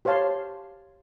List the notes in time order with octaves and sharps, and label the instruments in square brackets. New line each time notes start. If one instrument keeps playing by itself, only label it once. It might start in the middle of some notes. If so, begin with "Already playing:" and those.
[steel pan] G4 C5 C#5 F5 A5 C6